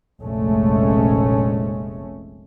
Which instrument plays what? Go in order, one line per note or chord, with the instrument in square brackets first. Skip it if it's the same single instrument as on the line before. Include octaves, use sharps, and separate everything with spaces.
[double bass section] F1 A#1 G#3 A3 C#4